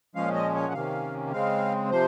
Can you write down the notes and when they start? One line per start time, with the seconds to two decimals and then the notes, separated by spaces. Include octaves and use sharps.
0.15 A#2 F3 G#3 C#4 F5
0.34 D#5
0.55 C#5
0.68 F#5
0.74 C3 D#3 A#3 C#4 F5
1.32 C#3 G#3 C4 F5
1.91 C3 F3 C5